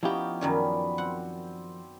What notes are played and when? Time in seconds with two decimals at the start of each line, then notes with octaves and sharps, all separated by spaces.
0.03 F3 B3 C#4 D#4 E4 G4
0.41 F#2 D#3 C#4 B4 D5
0.98 C4 F#5